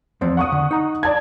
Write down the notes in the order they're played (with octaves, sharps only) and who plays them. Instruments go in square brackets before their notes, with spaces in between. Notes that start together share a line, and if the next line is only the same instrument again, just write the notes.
[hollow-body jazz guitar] E2 F3 C4
[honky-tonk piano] F#5 C#6 D#6
[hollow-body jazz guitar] D3
D#4 A#5
[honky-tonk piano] D5 A5 G#6